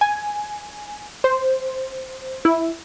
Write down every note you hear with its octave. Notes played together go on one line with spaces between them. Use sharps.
G#5
C5
E4